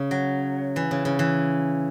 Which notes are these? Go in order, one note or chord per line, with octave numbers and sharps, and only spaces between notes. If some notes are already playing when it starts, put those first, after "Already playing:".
Already playing: C#3
F#3
E3
C#3
C#3
E3